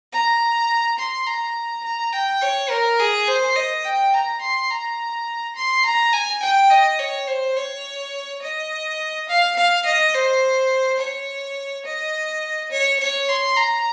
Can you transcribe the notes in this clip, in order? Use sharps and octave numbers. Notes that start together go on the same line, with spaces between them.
A#5
C6
A#5
A#5
G5
C#5
A#4
G#4
C5
D#5
G5
A#5
C6
A#5
C6
A#5
G#5
G5
D#5
C#5
C5
C#5
D#5
F5
F5
D#5
C5
C#5
D#5
C#5
C#5
C6
A#5